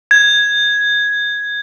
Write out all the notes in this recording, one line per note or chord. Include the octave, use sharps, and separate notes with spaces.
G#6